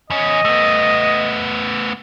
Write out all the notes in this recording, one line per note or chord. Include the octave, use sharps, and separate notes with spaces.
E2 C#4 D#5
A3 B3